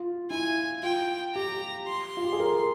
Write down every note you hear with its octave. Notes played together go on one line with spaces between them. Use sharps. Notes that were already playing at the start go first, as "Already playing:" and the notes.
Already playing: F4
E4 G#5
F4 G5
G4 A#5
C6
F4
G4
G#4
A#4